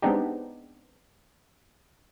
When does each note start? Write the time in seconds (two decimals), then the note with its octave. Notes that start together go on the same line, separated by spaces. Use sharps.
0.02 G#3 B3 C4 D4 D#4 G4